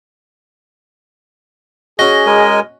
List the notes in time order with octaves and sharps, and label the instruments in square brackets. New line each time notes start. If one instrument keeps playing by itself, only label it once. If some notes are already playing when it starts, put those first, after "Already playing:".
[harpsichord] C#4 F#4 [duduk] G#4 [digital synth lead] D#5
[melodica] G#3 A#4 G#5